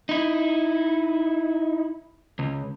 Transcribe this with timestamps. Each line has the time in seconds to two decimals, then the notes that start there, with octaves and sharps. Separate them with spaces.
0.09 D#4 E4
2.39 C#2